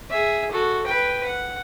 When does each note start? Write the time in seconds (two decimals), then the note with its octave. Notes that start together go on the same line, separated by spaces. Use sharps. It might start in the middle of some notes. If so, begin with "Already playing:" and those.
0.11 G#4 E5
0.51 F#4 A4
0.86 B4 G5
1.25 F#5